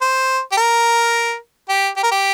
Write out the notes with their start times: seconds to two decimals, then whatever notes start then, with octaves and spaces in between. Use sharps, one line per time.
0.01 C5
0.52 G4
0.57 A#4
1.69 G4
1.97 G4
2.03 A#4
2.11 G4